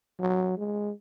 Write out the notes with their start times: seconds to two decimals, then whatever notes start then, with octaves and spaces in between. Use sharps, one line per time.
0.20 F#3
0.57 G#3